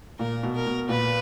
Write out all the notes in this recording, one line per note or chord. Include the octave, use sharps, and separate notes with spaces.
A#2 A#4
B2
A#4
B2
A#2 B4